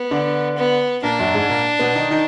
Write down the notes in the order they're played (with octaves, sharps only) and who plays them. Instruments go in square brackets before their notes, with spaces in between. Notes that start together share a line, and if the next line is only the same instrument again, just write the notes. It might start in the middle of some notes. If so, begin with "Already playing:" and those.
Already playing: [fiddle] B3
[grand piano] D3 D4
[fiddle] B3
[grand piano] A#2 A#3 [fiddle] D4
[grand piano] F#2 F#3
G#2 G#3
A#2 A#3
B2 B3
D#3 D#4
D#3 D#4